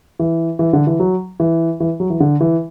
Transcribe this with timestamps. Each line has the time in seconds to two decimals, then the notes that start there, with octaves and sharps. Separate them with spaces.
0.19 E3
0.59 E3
0.73 D3
0.87 E3
0.99 F#3
1.40 E3
1.80 E3
2.00 F#3
2.10 E3
2.20 D3
2.41 E3